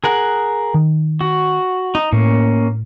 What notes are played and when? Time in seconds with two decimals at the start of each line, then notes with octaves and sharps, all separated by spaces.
0.04 G#4 A#4 F#5
0.74 D#3
1.21 F#4
1.95 D#4
2.12 A2 A#3 C#4